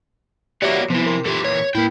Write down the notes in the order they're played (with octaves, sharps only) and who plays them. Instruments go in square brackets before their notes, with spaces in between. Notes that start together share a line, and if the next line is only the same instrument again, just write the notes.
[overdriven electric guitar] A#3 B3 [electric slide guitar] F#4 C#5 D5 [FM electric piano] G4 E5 D6
[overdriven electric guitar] C3 [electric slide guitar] F3 E4 [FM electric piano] B3
[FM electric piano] A#4 C6
[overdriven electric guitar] A#2 E3 [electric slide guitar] F4 G4 A4
[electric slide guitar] C#5
[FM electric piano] A2 A#3 [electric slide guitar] E4 [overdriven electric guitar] B4 G5